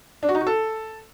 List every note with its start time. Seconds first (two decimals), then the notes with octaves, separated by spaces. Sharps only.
0.23 D4
0.29 F#4
0.35 D#4
0.41 F#4
0.47 A4